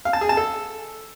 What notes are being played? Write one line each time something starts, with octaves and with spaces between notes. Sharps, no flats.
F5
A5
G#4
A5
A4